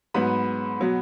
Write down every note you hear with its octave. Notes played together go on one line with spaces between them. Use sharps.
G#2 F#3 B3 B4 B5
B2 F#3 B3